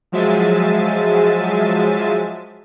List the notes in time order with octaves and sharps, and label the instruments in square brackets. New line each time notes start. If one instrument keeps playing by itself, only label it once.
[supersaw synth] F3 F#3 G#3 E5 A6 D#7